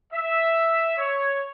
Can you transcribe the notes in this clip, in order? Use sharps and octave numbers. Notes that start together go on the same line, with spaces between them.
E5
C#5